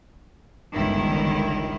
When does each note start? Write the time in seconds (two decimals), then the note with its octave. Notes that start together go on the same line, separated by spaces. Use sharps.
0.73 G1 C#2 G2 D#3 E4